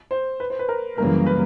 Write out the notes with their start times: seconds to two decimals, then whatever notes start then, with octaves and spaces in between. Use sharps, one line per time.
0.11 C5
0.40 B4
0.50 C5
0.59 B4
0.69 A#4
0.97 F#2 C#3 E3 G3 A#3 A#4
1.26 B4